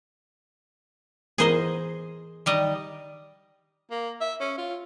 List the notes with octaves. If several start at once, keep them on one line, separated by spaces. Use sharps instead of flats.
E3 B3 G#4 A#4 C5 D#5
D#3 G3 D#5
A#3
E5
C#4
F4